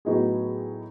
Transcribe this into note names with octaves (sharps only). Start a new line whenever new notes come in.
A2 F#3 B3 D#4 G#4